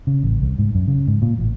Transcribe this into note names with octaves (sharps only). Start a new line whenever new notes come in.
C#3
A1
C2
G#2
F#2
C#3
G#2
A#2
A1